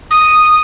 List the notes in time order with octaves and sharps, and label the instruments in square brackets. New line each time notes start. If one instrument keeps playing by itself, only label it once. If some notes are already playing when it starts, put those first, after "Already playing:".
[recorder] D#6